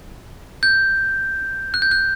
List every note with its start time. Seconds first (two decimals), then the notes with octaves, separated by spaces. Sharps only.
0.63 G6
1.74 F#6
1.82 G6
1.91 F#6